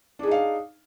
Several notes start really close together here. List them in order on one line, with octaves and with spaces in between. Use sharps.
D4 G#4 D#4 F5